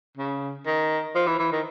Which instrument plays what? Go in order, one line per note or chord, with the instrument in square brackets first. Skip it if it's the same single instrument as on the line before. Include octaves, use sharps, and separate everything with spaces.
[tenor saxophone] C#3
D#3
F3
E3
E3
D#3